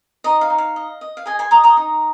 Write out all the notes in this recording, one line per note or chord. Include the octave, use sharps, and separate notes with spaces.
D#4 D#5
F5
D#4
F5
D#5
D#5
F5
G#4 D#5 G#5
G#5 C6
D#5 A#5 D#6
A#5 D#6
D#4